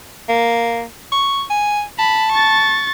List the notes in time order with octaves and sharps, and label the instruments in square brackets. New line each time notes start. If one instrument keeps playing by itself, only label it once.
[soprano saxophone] A#3
C#6
G#5
[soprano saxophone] A5 [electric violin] B5
[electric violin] C#6 A6